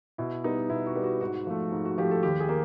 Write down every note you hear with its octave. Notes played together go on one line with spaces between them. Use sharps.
B2 E4
G3 B3 D#4
B2 E4
F#4
G3 B3
F#4
G#2 F#4
F3 A3
G#2
F#4
F3 A3 G4
A4
D#2 G4
G#4
A#3